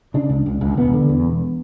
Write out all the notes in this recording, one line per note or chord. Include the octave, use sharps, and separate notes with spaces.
C#3 D4
C#2
C#2
C#2
E1 B3
D3
E2
E1